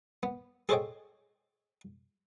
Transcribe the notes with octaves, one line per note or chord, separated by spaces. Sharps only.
B3
G#4 A4 C5 C#5 D#5 G5